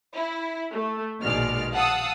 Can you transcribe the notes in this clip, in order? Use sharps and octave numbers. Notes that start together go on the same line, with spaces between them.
E4
A3
A#1 B2 D#3 G#3 D5 F6
F5 F#5 A5 D#6 E6